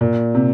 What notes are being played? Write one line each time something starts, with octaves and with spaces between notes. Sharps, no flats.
A#2
C3